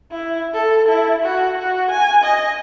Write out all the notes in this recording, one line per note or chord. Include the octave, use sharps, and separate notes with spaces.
E4
A4
E4
F#4
F#4
G#5
D#5